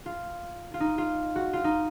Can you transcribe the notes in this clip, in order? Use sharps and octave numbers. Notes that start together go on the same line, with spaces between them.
F4
F4
D#4
F4
F#4
F4
D#4